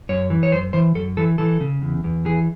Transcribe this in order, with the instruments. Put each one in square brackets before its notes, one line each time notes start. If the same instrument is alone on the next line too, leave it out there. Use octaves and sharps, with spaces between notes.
[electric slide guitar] F#2 C#5
E3
C#5
F#2 C5
E3 C5
F#2 A4
E3 A4
E3 A4
C#3
E2
E2
E3 G#4